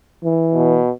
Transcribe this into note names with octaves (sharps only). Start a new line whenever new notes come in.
E3
B2